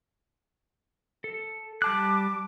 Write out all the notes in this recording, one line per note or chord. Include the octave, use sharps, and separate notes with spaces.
A4
G3 A5 D6 F#6